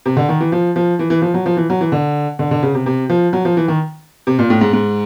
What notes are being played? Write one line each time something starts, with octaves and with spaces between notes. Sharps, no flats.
C3
D3
D#3
E3
F3
F3
E3
E3
F3
F#3
F3
E3
F#3
E3
D3
D3
D3
C#3
C3
C3
F3
F#3
F3
E3
D#3
C3
A#2
A2
G#2
G#2